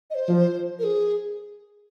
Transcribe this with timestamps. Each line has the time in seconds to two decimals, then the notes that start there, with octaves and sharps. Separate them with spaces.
0.10 D#5
0.15 C5
0.28 F3
0.79 A#4
0.83 G#4